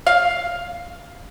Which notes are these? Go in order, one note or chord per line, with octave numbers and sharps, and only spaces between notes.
F5